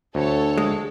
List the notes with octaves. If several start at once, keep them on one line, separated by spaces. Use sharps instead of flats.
D2 A4 C#5
G#3